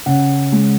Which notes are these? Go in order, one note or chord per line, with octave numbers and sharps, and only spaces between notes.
C#3 F#5
G#3